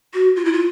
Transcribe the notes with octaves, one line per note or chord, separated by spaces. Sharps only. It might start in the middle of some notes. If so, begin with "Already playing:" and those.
F#4
F4
E4
F4